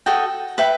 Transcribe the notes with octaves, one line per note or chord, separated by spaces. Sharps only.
F#4 A4 D#5 G5
B4 E5 G5 B5